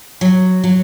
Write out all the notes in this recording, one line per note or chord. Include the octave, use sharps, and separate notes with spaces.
F#3
F#3